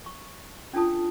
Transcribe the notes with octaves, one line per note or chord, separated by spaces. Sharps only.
C#6
C#4 D4 F4 A4 A5 D#6